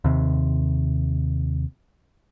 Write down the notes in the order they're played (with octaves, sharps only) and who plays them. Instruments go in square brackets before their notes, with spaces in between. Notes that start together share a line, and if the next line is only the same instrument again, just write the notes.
[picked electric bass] D#2 C3